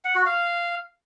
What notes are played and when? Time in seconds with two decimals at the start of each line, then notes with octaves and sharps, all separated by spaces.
0.05 F#5
0.15 F#4
0.26 F5